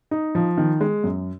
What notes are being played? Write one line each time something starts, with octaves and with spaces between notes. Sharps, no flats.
D#4
F3
D#3
G#3
F#2